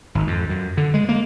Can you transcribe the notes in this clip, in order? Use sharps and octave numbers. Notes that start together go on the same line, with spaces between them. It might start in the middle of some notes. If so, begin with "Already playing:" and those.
G#1
F2
F#2
D3
G#3
A#3